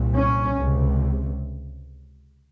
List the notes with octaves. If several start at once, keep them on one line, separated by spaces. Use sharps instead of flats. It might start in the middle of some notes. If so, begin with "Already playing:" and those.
Already playing: C2 A#2
C#4
C#2 C3